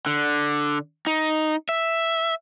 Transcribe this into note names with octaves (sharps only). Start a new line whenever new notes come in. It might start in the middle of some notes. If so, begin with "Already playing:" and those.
D3
D#4
E5